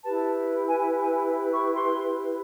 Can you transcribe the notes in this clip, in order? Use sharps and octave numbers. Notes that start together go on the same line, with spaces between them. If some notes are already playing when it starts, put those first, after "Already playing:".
E4 G4 B4 A5
G#5
G#5
C#6
C6